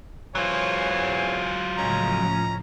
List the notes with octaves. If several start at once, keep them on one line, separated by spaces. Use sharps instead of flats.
E2 F#3 F4 C5 C#5 G#5
A2 C#3 F3 G#3 C#4 A#5